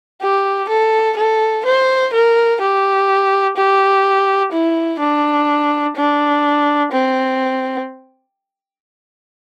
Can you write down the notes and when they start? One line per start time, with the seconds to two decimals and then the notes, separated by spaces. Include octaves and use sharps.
0.21 G4
0.69 A4
1.17 A4
1.65 C5
2.13 A#4
2.61 G4
3.56 G4
4.52 E4
5.00 D4
5.96 D4
6.91 C4